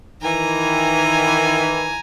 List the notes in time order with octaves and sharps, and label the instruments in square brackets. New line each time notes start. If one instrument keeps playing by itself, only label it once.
[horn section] D#3 E3 [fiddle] G#5 A#5